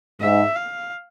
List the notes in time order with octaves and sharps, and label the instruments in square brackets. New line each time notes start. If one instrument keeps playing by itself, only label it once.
[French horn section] G#2 [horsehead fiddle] E5
[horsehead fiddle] F5